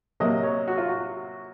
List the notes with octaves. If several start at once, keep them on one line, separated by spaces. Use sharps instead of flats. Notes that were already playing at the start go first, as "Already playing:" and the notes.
C3 F#3 A#3 D#5
C#5
F#4
F4
F#4